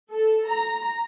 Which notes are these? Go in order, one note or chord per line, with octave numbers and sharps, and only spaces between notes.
A4
A#5